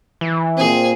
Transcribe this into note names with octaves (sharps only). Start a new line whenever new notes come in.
E3
A#2 C4 G#4